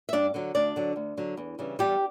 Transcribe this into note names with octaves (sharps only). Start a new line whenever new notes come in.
E5
G2 D4 D5
D3 F#3
D2 D4 D5
D3 F#3
D2
D3 F#3
E2
C#3 E3 G3
E2 G3 G4